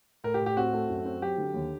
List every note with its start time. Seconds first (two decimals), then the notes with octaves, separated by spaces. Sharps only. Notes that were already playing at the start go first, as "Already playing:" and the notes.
0.24 A2 A#4
0.34 G4
0.40 A2
0.46 G4
0.57 C4 F#4
0.73 A3
0.89 F#2
1.05 C4
1.22 F#3 G4
1.38 D3
1.54 D#2